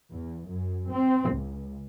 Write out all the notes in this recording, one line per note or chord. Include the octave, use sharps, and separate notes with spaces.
E2
F#2
C4
C#2